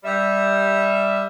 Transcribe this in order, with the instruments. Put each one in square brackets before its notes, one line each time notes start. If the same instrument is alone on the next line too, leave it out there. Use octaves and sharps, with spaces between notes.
[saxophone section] G3 E5